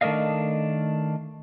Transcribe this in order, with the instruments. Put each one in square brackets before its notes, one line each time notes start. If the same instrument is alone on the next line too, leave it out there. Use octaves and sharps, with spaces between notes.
[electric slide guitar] D#3 A3 D4 A#4 D#5 F5